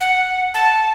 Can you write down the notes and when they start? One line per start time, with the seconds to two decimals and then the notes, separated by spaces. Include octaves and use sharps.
0.01 F#5
0.54 A5